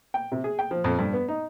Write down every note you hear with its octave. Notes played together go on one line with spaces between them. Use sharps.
G5
C3
G#4
G5
F3
F2
G2
B3
D#4